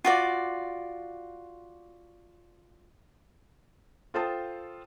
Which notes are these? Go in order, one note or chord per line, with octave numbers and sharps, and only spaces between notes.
F4 F#4 D5
F4 A4 C5 G5 A5 D#6